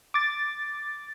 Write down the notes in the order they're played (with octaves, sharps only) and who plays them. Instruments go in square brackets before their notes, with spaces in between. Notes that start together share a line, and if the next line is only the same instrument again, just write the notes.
[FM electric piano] D6 A6